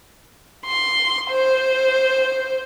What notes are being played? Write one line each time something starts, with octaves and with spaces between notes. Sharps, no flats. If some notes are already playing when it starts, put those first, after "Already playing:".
C6
C5